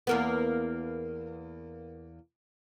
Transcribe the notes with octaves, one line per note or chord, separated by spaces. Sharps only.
E2 A#3 B3